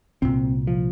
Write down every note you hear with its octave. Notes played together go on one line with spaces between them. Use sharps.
C2 A#2 C4
F3